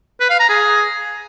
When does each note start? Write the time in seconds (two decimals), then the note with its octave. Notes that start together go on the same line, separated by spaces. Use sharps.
0.20 B4
0.30 F5
0.40 A#5
0.49 G#4